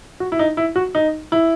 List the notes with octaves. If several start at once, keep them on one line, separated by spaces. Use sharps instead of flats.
F#4
E4
D#4
E4
F#4
D#4
E4